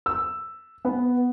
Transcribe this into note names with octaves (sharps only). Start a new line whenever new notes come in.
E6
B3